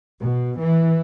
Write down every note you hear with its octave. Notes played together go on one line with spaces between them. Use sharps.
B2
E3